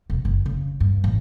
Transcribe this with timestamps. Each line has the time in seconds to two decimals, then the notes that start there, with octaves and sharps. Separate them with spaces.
0.10 E1
0.25 F#1
0.46 C#3
0.80 G2
1.04 A1